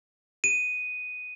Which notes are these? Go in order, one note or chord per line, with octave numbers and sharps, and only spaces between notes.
D#7